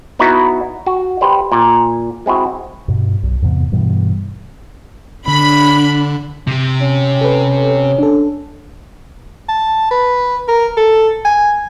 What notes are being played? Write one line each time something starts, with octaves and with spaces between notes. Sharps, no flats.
B3 D#4 E4 F#4 B4
F#4
G4 B4 C5 D5
A#2
G#3 C4 E4 F#4
G2 B2
B1
E2 G#2 C3 B3
G2 B2 E3 G3
D3 D4 B5
C3 G4
C#4
A4 B4
D4 A4
A5
B4
A#4
A4
G#5